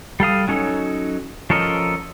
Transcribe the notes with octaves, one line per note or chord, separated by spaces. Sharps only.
G3 A4 F5 D#6
F#3 C#4 D#4 A4
F3 C#4 A4 A#4 D#5